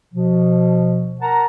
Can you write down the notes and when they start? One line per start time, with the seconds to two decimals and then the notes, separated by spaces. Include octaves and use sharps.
0.13 B2 F3
1.21 A#4 F#5 A5 A#5